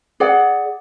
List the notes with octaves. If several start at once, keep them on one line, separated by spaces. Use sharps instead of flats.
G#4 D5 F#5